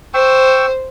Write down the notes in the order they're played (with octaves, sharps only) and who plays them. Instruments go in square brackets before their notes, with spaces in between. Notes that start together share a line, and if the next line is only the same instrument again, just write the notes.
[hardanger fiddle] C5 [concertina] G5 C#6 E6